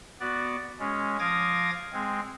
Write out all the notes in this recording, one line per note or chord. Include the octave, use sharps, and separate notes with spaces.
B3 F#4 D5
G#3 C#4
F3 F5 D6 D#6 G#6 A#6
G#3 C4